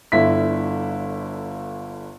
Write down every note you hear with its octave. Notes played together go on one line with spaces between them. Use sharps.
G1 D3 E4 B6